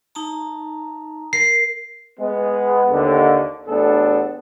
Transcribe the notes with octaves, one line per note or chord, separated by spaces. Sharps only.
D#4 A5 A#5
A#4 C7
G#3 B3
D#2 D3
A1 A2 B3 D4 G#4 A4